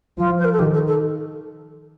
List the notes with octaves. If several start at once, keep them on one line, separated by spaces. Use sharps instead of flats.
F3 F4
C5
A#4
A4
D#3 G4
A4
A4